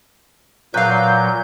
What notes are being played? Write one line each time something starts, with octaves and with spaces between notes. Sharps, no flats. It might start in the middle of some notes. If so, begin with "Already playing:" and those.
A#2 F#3 B4 F5 G6